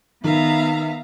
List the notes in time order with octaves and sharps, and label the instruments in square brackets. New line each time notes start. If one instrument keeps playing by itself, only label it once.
[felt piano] D#3 [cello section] B3 E5 [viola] F5 A#5